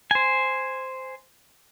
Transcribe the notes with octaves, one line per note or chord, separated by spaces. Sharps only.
C5 G#5